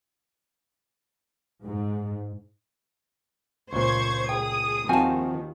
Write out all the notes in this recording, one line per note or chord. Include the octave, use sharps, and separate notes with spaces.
G#2
C#2 A#2 C5 C#6 G#6
G#4 G5 D#6
D#2 A#2 D#3 F3 C4 F#4 G#5 A5